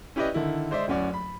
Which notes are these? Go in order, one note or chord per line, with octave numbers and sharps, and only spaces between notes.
C#4 E4 G4 B4 D5 D#5
D3 D#3 E4
G#3 C5 D5 E5
D1 F#2 C#4 F#4 D5
B5